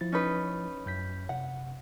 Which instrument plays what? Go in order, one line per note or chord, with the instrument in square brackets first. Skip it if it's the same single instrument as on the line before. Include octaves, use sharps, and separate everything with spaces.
[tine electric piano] F3 E4 A6
[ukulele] C#4 D#4 B4
[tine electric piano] F#2 G6 B6
[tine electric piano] C3 [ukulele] F#5